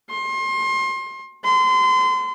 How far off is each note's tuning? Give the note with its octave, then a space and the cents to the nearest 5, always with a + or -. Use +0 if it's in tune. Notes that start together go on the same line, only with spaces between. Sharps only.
C6 +30
C6 -30